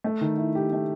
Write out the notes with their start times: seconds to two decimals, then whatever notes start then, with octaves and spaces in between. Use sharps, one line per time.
0.04 A3
0.21 D#3
0.37 E4
0.55 G4
0.72 A3